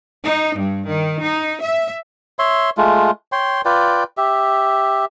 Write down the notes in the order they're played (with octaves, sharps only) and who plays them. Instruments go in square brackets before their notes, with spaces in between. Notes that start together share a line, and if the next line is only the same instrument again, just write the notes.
[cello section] D#4
G2
D#3
D#4
E5
[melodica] C#5 E5 C6
G#3 A3 F4
C#5 G5 C6
F4 B4 D5 G5
G4 E5